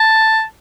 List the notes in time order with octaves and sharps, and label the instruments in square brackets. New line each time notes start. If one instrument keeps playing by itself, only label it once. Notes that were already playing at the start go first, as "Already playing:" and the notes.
Already playing: [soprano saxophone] A5